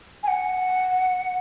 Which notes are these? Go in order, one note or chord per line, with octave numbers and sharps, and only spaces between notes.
G#5
F#5